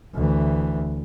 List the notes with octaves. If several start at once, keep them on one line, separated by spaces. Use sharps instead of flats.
D2 E3